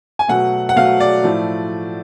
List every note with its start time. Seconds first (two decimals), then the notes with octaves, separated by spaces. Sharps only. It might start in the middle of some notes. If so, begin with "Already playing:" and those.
0.19 G#5
0.28 B2 F#3 A3 F#5
0.69 F#5
0.76 B2 F#3 A3 F5
1.00 D5
1.24 A2 F3 A3